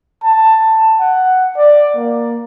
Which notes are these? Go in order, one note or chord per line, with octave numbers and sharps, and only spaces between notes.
A5
F#5
D5
A#3